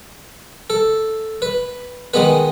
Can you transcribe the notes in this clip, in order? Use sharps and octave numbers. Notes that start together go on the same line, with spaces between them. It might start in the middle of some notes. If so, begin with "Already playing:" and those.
A4
B4
D#3 G#3 B3 B4